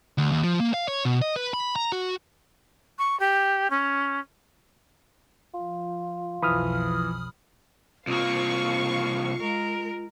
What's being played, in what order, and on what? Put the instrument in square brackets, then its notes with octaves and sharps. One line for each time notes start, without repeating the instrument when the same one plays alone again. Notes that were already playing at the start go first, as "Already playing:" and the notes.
[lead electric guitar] D2
D#2
F3
A#3
F5
C#5
B2
D#5
B4
B5
A#5
F#4
[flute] C#6
G4
C#4
[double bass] F3 [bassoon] F4
[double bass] B1 F2 [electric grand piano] E3 F3 [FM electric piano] B5 D#6 F6
[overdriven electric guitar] C2 A#3 [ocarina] F4 [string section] F5 C#6
[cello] G#3 A#4